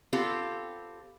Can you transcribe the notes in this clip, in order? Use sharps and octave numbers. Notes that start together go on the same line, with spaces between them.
B3 C4 F4 G4 A4